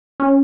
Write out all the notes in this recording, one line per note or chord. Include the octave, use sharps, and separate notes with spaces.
C#4